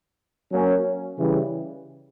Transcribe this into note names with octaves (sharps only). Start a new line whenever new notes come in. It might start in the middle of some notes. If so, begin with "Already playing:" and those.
F#3 A#3 C#4
C#3 E3 G3